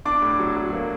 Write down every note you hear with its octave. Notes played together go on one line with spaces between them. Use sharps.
D4 D6
A2
F#3
F#3
A#3